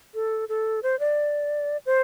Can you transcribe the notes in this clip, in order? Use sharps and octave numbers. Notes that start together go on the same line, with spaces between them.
A4
A4
C5
D5
C5